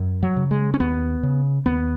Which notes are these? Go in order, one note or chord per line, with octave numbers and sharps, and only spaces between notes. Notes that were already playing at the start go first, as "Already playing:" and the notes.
Already playing: F#2
F#3
C#3
G#3
C#4
D#2 B3
C#3
D#2 B3